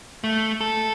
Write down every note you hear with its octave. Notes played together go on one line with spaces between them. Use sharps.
A3
A4